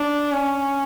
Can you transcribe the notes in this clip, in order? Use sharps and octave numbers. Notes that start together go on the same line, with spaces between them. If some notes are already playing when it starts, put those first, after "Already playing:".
Already playing: D4
C#4